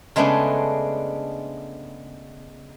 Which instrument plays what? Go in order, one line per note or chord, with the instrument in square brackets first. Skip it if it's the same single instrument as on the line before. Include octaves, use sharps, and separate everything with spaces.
[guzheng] C#3 G#3 A3 B3 D4